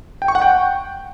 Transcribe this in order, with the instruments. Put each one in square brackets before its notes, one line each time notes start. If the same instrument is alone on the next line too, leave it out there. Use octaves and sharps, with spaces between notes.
[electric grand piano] G5
C#6
F#5
G5